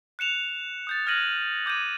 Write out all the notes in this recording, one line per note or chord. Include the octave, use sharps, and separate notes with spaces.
F#6 C#7 E7 F7
D#6 G6 A6
F6 F#6 G#6 A#6 D#7 F#7
D6 G6 G#6 D#7